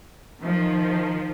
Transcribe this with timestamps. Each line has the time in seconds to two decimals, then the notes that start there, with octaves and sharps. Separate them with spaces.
0.42 D#3 F3